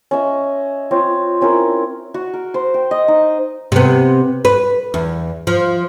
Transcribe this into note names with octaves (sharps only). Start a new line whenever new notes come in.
C#4 D#5 E5
C4 F4 C#5
C4 C#4 E4 A#4
F#4
A#4
C5
G5
D#5
D#4
C3 B3
B4
E2
F3